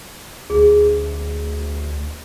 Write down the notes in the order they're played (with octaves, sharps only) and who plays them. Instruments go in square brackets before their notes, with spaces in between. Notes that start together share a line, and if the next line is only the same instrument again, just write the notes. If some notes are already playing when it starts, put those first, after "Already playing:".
[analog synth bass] D2 [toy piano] G#4